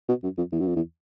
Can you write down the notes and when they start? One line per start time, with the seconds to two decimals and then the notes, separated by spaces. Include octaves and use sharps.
0.09 B2
0.23 F#2
0.38 F2
0.52 E2
0.60 F#2
0.67 F2
0.76 E2